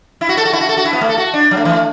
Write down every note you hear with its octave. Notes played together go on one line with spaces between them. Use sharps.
E4
F#4
A4
F#4
E4
F#4
A4
F#4
E4
B3
A3
A4
F#4
D4
F#3
A3
E3
A3